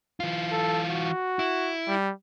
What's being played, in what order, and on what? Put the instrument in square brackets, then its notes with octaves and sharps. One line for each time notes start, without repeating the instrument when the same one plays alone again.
[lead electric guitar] E3 F4
[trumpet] A4
F#4
[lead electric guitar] E4
[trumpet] G3